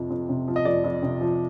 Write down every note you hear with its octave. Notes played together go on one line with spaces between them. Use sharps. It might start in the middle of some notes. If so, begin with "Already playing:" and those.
Already playing: F2 C3 F3
F2
C3
F3
D#5
F2 D5
F2
C3
F3